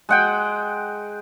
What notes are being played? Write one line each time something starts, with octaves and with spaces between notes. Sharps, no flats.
G#3 F#5 G5